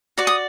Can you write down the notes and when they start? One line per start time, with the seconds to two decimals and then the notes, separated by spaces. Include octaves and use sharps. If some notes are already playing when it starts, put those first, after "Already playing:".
0.18 F#4 D5 D6
0.27 D#6